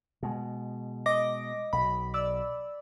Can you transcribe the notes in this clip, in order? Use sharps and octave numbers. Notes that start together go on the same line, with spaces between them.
B2 G#3
D#5 D6 A#6
B1 B5
D5 E6